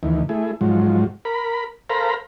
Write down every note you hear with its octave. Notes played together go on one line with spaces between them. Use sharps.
D2 D#3 E3
A3 E4 G#4
G#2 F3 F#3
A#4 B5
A4 A#4 C5 F5 A#5 B5